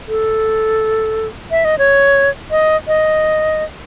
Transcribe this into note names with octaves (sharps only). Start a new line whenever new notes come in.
A4
E5
D#5
C#5
D#5
D#5